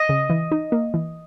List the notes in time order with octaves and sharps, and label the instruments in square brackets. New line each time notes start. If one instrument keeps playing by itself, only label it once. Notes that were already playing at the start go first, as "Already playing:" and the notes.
Already playing: [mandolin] D#5
[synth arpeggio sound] C#3
E3
D#4
A#3
E3